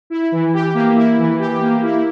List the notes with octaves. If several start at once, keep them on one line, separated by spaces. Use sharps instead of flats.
E4
E3
G4
A#3
E4
E3
G4
A#3
E4